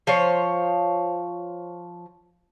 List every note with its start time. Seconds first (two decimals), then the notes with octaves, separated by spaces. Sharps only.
0.07 F3 C5 C#5